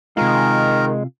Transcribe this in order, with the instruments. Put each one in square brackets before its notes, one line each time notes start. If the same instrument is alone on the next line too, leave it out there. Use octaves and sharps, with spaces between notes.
[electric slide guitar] C3 F4 [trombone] D#3 [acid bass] G#3 [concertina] A#4